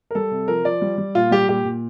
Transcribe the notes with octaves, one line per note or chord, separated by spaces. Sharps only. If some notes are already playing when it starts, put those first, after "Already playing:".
A#4
G3 A4
C3
F3 A#4
F3 D5
G3
G3
A#2 F4
G3 G4
A#2 G4
A#2